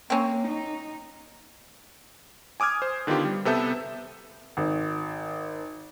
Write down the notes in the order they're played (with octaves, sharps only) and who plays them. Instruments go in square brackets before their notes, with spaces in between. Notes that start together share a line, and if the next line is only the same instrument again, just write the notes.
[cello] A#3 [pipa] C4 C#4
[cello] D#4
[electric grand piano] G#5 D6 D#6 F6 G#6
C5
D3 D#3 B3 F4 G4
G3
C3 B3 A4 E5 G6
[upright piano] G#1